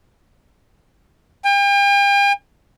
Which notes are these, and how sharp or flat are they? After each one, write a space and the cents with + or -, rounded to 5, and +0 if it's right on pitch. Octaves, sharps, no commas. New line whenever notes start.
G5 +40